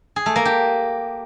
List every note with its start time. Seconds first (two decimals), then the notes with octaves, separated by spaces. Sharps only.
0.16 G#4
0.26 A3
0.36 A#3
0.45 G4